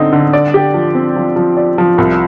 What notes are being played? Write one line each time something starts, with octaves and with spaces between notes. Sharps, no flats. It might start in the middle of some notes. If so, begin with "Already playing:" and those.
Already playing: D3 C4 D#4
D3
D5
G4
F3
C4
F3
F3
D5
F3
C2